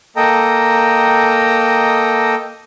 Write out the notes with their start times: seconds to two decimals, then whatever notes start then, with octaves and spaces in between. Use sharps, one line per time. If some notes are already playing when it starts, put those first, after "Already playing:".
0.16 A#3 A4 D#5 G5 A#5